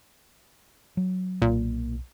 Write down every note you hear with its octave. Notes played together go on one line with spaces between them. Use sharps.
F#3
B1 A#2